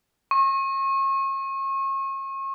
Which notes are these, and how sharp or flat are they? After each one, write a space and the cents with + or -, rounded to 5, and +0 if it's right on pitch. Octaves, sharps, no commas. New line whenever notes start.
C#6 -35